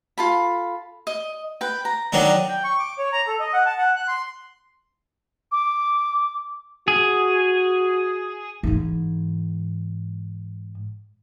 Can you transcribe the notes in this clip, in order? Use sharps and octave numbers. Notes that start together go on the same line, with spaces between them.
F4 A4 B5
D#5
B4 G5
A#5
D#3 F#3 D4
G5
C#6
D6
C#5
A#5
A4
D#5
F#5
A5
F#5
F#6
C6
D6
F#4 G#4
G#2 E3